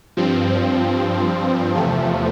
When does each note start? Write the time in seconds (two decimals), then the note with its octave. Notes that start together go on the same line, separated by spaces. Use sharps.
0.17 G2 F3 C4
1.75 E2 C3 F3 A3